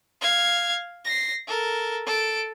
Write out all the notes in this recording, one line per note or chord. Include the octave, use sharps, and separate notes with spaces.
F5 G#6
A#6 C7
A4 A#4
A4 D7